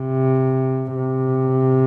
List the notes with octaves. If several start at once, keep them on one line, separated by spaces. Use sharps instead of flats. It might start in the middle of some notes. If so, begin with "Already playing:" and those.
Already playing: C3
C3